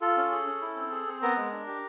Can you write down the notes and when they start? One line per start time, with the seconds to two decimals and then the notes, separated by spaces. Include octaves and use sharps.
0.01 F4 A4
0.17 C#4
0.32 G#4
0.47 C#4
0.62 E4
0.77 C4
0.92 G#4
1.07 C4
1.22 B3 A#4
1.37 G#3
1.52 D4
1.67 G4